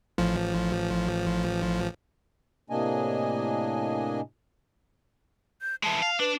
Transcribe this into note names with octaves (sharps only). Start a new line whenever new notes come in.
A1 F3
A2 C3 A#3 D4 D#5 G#5
G6
E3 G#3 A5
F5
D4 B4